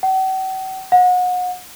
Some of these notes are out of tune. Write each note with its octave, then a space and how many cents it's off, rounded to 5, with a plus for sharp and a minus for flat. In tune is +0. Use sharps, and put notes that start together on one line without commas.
F#5 +45
F#5 -30